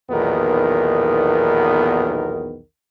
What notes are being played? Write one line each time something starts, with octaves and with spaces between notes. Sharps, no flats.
B1 E2 A#2 D#3 B3 A#4